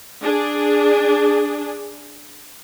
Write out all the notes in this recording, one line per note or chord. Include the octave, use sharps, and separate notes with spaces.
D4 G#4